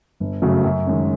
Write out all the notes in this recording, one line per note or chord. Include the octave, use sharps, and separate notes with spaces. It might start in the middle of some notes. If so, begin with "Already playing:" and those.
G1
F#2 C#3 F#3 A3
F#2
D#3 G#3 C#4